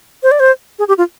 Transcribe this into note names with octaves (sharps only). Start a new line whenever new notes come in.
C5
D5
C5
G#4
G4
F4